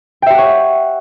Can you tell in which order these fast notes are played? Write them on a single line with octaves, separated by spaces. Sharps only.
G5 E5 G4 F#5 C#5